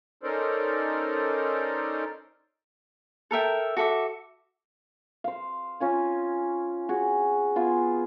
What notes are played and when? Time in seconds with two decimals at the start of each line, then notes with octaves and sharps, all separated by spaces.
0.23 C#4 D#4 A4 A#4 C5 D5
3.31 A4 A#4 E5 G5
3.77 F#4 A4 E5 D6
5.24 C5 F5
5.80 C#4 F4 G#5
6.89 F#4 G#4
7.56 B3 F4 G#4